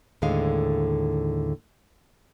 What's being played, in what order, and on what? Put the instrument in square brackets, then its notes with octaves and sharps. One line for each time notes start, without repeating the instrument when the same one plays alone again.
[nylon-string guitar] D#2 A2 D3 G#3 F5